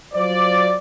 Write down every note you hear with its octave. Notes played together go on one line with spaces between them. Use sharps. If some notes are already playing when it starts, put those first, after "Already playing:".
F#3 F4 C5 D5